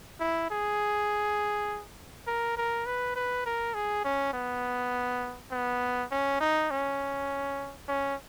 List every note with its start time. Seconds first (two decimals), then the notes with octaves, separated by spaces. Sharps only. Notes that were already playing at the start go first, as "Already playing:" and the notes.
0.20 E4
0.51 G#4
2.27 A#4
2.57 A#4
2.86 B4
3.16 B4
3.46 A#4
3.74 G#4
4.04 C#4
4.33 B3
5.51 B3
6.11 C#4
6.41 D#4
6.70 C#4
7.88 C#4